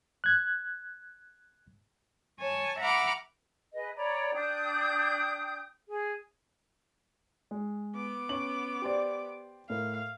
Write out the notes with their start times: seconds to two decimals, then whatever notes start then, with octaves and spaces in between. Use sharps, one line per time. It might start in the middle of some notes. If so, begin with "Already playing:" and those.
0.24 F#6 G#6
2.39 C#5 G#5 A5
2.79 E5 F#5 A#5 B5 D6 F6
3.73 G#4 B4 D#5
3.96 C#5 D5 A#5 B5
4.34 D4 G5 D#6 G6
5.89 G#4
7.51 G#3
7.95 B3 D6
8.29 C#4 C#6 F#7
8.82 G4 C5 D5
9.70 A2 A#4 F5